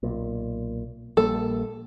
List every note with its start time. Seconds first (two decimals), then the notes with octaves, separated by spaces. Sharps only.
0.03 B1 A#2
1.17 A#1 G3 A#3 A4